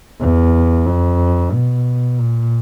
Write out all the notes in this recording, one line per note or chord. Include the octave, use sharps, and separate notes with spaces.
E2
F2
B2
A#2